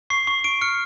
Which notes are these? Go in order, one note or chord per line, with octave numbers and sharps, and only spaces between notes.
C#6 C7
C#6
C#6 D7
F6 C#7